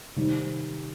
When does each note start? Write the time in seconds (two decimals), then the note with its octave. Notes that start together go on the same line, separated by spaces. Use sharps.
0.16 C3 D#3 G3